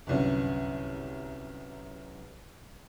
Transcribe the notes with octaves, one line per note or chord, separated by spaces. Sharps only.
G1 C2 F#2